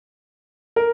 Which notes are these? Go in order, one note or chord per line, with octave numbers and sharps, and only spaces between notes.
A#4